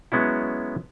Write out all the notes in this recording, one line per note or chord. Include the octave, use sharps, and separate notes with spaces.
F#3 G#3 B3 C#4 E4